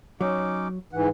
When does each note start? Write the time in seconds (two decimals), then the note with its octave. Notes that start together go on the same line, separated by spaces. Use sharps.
0.21 F#3 C#4 D#4 D6
0.93 G#2 E3 F#5